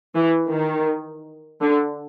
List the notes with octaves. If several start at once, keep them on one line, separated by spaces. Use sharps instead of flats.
E3
D#3
D3